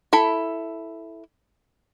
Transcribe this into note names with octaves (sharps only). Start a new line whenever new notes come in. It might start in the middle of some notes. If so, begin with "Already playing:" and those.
E4 A4 B5